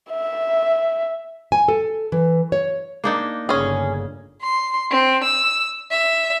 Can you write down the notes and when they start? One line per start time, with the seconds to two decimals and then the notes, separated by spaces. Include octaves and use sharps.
0.11 E5
1.52 G#5
1.68 A4
2.12 E3
2.52 C#5
3.04 A#3 D4 D#4
3.49 G1 C#3 C#4 G#4
4.41 C6
4.90 C4
5.23 E6
5.90 E5